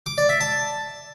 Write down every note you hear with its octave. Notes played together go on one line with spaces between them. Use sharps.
D6
D5
E5
A5